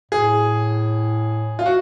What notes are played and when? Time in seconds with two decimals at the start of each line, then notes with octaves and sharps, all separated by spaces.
0.11 A2 G#4
1.59 F4
1.66 F#4